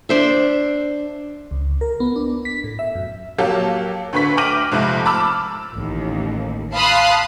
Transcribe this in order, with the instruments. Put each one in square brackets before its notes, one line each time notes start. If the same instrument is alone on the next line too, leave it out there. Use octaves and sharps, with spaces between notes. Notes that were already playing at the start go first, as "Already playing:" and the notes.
[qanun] D4 C5 E5
[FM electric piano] C#2
A#4
B3
D4
B6
A2
E5
F#2
[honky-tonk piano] F#3 A#3 G4 A4 F5
D2 D3 B4 C#6 B6
G5 D6 F6 A#6 D#7 F#7
F2 G#2 C3 F3 A3
A5 B5 D6 E6 F6
[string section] A1 D#2
F5 A5 B5 C6 D#6 F#6